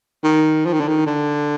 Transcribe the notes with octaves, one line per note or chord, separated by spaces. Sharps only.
D#3
F3
D#3
D3
D#3
D3